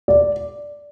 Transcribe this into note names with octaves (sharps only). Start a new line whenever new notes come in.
D5